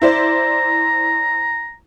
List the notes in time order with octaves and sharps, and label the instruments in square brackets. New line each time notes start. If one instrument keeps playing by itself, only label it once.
[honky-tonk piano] E4 C5 D5 [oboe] A#5